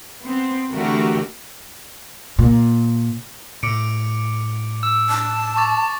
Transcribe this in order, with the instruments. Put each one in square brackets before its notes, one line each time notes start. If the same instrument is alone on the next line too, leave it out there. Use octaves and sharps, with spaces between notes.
[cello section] B3 C4
D3 E3 A3 F#4 G4 A#4
[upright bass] A#2
[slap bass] A2 [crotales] D6 C#7 D7
[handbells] E6
[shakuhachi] A5
[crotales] C#6 D6 A6